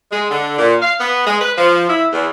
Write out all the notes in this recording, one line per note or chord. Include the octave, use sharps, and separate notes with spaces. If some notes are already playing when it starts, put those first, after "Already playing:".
G#3
D3
A#2
F5
B3
G#3
B4
F3
E4
E2